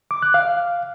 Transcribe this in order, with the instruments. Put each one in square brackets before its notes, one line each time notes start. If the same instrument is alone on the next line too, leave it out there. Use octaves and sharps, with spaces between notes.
[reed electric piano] D6
F#6
F5